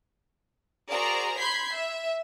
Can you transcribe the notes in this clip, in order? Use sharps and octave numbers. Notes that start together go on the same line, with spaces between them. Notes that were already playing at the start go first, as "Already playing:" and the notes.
F#4 G#4 A#4 C5 D5 A#5
B5 C6 G6 G#6 B6 C7
E5